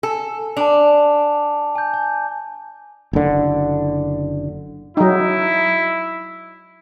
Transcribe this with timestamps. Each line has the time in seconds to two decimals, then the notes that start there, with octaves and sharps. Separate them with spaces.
0.03 A4 G#5
0.57 D4 A5 D6 F7
1.75 G#5 G6
1.94 G#5
3.13 F#1 D3
4.97 F#3 D#4 E4